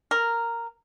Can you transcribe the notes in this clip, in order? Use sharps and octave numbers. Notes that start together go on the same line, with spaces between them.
A#4